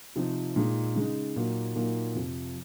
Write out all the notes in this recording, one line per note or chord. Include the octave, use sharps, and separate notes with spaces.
C3 F3 C4 D#4
A#2 G#3 D#4
C#3 G#3 D#4
A#2 F#3 A#3 D#4
A#2 F#3 A#3 D#4
F2 C3 F3